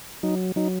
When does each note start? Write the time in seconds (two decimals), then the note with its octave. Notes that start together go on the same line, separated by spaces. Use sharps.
0.23 F#3 D#4
0.56 F#3 D#4